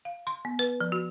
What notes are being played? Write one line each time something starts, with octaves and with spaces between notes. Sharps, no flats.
F5
C6
B3
B4
F3
F#4